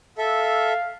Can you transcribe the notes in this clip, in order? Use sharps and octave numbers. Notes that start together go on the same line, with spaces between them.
A4 E5 F5